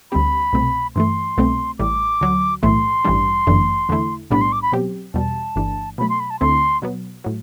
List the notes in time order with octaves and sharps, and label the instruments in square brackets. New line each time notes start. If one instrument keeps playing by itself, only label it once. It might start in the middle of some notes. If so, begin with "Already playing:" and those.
[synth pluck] D2 D3 G3 C4 G4 [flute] B5
[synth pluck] C2 B2 A3 C4
[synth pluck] G2 E3 A3 [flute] C6
[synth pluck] C2 B2 A3 C4
[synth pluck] A1 A2 G3 [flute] D6
[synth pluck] D2 D3 F#3
[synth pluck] B1 A2 E3 A3 [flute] C6
[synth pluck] A1 G2 E3 G3 D4
G1 F#2 E3 A3 D4
E2 D3 A3 E4
[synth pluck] B1 A2 G3 B3 D4 [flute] B5
[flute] C6
D6
B5
[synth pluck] B2 F#3 C4 G4
[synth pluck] E2 B2 G3 [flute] A5
[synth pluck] G1 G2 E3 A3 D4
[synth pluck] B2 F#3 A3 [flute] B5
[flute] C6
B5
A5
[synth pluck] D2 D3 A3 C4 E4 [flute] C6
[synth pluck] B2 F#3 B3
A2 F#3